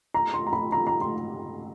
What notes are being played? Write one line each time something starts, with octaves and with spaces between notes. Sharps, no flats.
A#5
C6
A#5
B5
A#5
A#5
C6